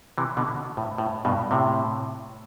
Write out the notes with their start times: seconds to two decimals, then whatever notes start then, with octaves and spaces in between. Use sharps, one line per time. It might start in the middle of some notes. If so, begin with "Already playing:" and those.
0.18 C3 E3
0.37 B2 D3
0.77 A2
0.98 A2
1.25 G2 B2
1.51 A2 C3